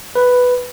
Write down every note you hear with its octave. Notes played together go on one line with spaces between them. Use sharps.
B4